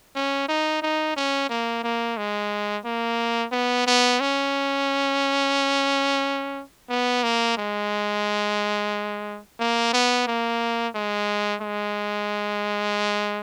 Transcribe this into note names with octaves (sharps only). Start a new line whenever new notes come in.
C#4
D#4
D#4
C#4
A#3
A#3
G#3
A#3
B3
B3
C#4
B3
A#3
G#3
A#3
B3
A#3
G#3
G#3